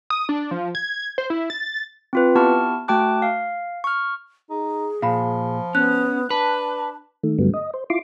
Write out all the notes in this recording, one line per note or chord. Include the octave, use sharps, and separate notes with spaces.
D#6
D4
F3
G#6
C5
E4
A6
C4 F4 B4
B3 E4 G4 A5 C#6 F6
A3 F#4 G5 A5 D6 F#6
F5
C#6 F6
D#4 G#4
A#2 F3 F5 B5
B3 C#4 F#6
D4 B4 A5
D#3 A3
G2 D3 F#3 G3 A3 B3
D#5
C5
E4 F4 C6 D6